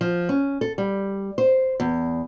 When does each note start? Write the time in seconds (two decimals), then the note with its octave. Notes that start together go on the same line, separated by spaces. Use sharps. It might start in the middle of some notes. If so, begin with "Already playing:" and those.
0.01 F3
0.29 C#4
0.61 A4
0.78 G3
1.38 C5
1.80 E2